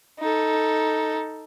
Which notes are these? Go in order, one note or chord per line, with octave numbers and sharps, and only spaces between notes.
D#4 A4